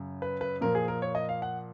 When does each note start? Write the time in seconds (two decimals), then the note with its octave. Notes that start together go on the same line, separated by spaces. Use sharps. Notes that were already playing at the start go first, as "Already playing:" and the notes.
Already playing: F#2 C#3
0.22 B4
0.41 B4
0.61 A#2 F3 A#3 A#4
0.75 G#4
0.88 A#4
1.02 C#5
1.15 D#5
1.29 F5
1.42 F#5